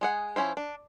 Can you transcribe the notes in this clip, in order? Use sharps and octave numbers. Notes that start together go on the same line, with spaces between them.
G#3 G#4 F#5
F3 C4 C#4 E4 C5
D4